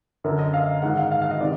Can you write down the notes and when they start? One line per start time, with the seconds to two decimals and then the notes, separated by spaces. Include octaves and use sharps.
0.24 F#2 D3 A#4
0.39 D#5
0.54 F5
0.82 G#2 D#3 F#5
0.97 F5
1.11 F5
1.22 F5
1.31 D#5
1.41 C3 D#3 D5